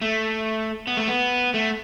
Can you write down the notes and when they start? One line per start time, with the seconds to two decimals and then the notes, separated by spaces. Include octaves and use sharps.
0.01 A3
0.87 B3
0.97 A3
1.08 B3
1.54 A3